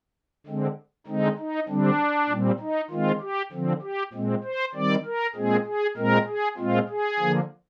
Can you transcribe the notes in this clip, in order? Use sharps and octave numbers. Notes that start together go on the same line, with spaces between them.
D3 G#3 C4
D3 G#3 C4 D#4
D#4
D3 G3 C4 D4
A#2 G3 C4
D#4
D#3 G#3 C4 F4
G4
D3 F3 C4
G4
A#2 G#3 C4
C5
D#3 G3 C4 D5
A#4
A#2 G#3 C4 G#4
G#4
A#2 G#3 C4 A#4
G#4
A#2 G#3 C4 F4
G#4
D3 F3 A#3